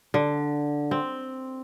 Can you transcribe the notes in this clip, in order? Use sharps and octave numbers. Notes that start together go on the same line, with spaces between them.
D3
C4